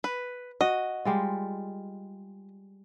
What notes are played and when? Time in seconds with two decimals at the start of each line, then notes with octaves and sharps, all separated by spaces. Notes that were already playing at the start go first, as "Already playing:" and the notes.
0.04 B4
0.61 F#4 D#5
1.05 G3 G#3 F4